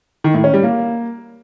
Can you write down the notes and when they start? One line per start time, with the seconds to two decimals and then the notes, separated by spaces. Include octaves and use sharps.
0.24 D#3
0.34 A2
0.44 C#4
0.54 G3
0.63 A#3